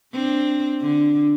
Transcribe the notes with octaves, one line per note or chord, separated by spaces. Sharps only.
C4 D4
D3 D4